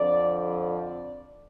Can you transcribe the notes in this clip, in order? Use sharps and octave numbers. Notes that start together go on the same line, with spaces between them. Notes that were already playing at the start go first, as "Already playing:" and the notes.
Already playing: F2 D3 F3 D5
D5